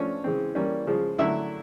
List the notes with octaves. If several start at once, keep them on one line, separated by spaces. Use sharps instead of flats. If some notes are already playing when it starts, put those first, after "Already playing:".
Already playing: F3 A3 C#4 D4 C#5
C#3 E3 G#3 C4
E3 G3 A#3 C#4
C#3 F3 G#3
D3 F#3 A3 E4 E5